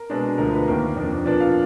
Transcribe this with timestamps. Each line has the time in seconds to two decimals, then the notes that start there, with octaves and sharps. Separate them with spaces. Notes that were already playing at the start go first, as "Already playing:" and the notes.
Already playing: A#4
0.10 B2 G#3 D4
0.38 D2 D3 F3 A#4
0.53 B4
0.68 D#2 D#3 A#3
0.96 F2 F3 A#3 D4
1.26 A#2 F3 B3 D4 D5
1.40 F5